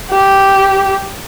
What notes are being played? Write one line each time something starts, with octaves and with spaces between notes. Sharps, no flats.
G4